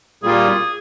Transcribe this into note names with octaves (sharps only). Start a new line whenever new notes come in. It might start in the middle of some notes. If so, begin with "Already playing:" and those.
A#2 G3 A#3 F4 G#4